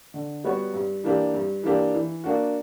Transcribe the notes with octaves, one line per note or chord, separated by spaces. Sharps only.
D3
G3 B3 F#4 C#5
G2
E3 A#3 D4 G4
G2
E3 A#3 D4 G4
E3
A#3 D4 F#4